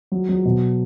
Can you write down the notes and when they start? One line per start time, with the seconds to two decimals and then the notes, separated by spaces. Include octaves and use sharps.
0.12 F#3
0.29 F#3
0.45 B2